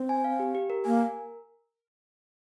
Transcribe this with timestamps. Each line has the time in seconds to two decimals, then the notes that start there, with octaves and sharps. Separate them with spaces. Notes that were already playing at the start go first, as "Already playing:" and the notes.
Already playing: C4
0.09 G#5
0.24 F5
0.40 G4
0.55 G4
0.70 A#4
0.85 A#3 G#5
1.00 A#4